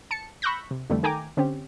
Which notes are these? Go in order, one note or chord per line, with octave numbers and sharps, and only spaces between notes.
A5 C#7
B5 C#6 E6 F#6 G6 A#6
C3
F2 D3 E3 G3 A3
D#3 A3 G5 G#5 A#5 D6
D3 C4 C#4 G4